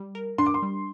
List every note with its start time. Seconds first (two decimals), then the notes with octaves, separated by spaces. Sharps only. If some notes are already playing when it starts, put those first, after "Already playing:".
Already playing: G3
0.15 A#4
0.38 D4 C6
0.46 D6
0.54 C6
0.62 G3